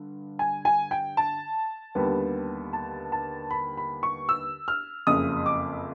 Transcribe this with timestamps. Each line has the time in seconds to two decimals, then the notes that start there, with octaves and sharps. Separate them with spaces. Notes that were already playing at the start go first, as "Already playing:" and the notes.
Already playing: G2 D3
0.39 G#5
0.65 G#5
0.91 G5
1.17 A5
1.95 D#2 D3 G3 B3
2.73 A5
3.12 A5
3.51 B5
3.77 B5
4.03 C#6
4.29 E6
4.68 F6
5.07 F#1 F2 C#3 D#6
5.46 D6